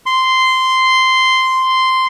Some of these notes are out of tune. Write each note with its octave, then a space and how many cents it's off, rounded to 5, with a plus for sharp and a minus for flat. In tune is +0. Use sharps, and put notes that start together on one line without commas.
C6 -10